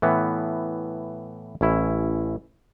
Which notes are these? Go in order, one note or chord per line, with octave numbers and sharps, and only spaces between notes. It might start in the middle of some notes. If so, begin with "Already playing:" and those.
A2 E3 B3
A1 C#4 E4